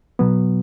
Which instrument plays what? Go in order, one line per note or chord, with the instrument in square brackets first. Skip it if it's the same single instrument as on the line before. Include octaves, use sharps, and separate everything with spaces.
[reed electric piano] B2 F#3 B3